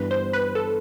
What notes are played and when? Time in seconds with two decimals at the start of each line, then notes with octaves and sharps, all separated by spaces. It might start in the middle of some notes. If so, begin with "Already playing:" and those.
Already playing: G1 G2 E3 G3 B3 B4
0.11 C5
0.33 B4
0.55 A4